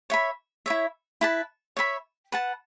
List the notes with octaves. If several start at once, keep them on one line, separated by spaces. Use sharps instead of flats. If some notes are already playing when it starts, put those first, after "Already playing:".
C#5 E5 B5
E4 C#5 E5
E4 B4 A5
C#5 E5 B5
B4 F#5 A5